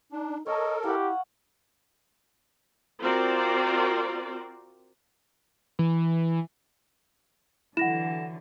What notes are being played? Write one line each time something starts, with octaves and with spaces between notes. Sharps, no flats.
D4 D#4
A4 A#4 C#5 D#5 G#5 A5
E4 G4 F5 F#5
C4 F4 F#4 A#4 C5 D5
E3
D3 E3 F#3 E4 F#5 A#6 E7